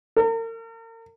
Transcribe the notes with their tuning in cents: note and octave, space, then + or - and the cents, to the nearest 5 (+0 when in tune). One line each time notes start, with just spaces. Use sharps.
A#4 -40